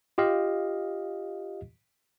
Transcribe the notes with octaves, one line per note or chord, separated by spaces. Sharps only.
F4 G4 D#5 F5